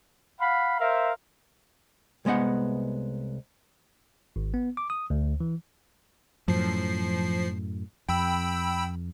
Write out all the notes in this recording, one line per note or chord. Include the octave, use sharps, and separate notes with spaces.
F5 F#5 B5
A#4 C5 E5 F5
C2 G#3 B3 D#5 F#5
G#1
B3
D6
D#6
D2
E3
F#2 A2 F3 C7
F2 G5 B5 E6